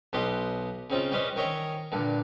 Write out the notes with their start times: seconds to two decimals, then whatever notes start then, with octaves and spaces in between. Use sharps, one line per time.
0.13 B1 B3 G4 D#5 C6
0.90 C#3 C4 D#4 F4
1.12 G3 C#4 B4 C5 D#5
1.36 D#3 A#4 C#5 D#5 E5 G#5
1.92 G2 A#2 D3